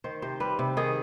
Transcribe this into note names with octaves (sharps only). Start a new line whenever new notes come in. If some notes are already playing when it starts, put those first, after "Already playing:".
D#3 C5
C3 C5
G3 B4
C3
D#3 G#4